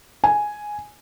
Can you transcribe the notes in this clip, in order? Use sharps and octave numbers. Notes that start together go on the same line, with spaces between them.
G#5